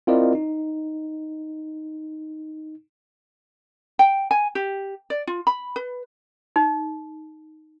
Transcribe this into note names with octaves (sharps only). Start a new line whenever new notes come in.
C4 E4 F4 A#4 D5 D#5
D#4
G5
G#5
G4
D5
F4
B5
B4
D#4